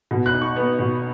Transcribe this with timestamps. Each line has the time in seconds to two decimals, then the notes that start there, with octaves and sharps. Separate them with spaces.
0.11 B2
0.26 F#6
0.34 D#4
0.41 C#6
0.56 B3
0.79 B2